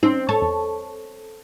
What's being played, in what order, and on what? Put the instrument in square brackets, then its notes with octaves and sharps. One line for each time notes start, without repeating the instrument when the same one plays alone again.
[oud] C4 [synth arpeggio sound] C#4 D#4
[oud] A4 C#5
[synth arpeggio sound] E2